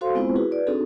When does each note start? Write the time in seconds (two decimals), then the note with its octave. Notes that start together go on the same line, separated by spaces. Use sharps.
0.01 F#4 A4 C5 F5 C6
0.15 G#3 B3 C4 E4 F4 C5
0.36 E4 F#4 G#4 B4
0.51 B4 D5
0.67 C4 D4 D#4 F#4 G#4 A4